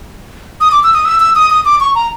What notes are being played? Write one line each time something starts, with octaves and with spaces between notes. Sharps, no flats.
D#6
D6
E6
D#6
E6
E6
D#6
D#6
D6
C#6
A#5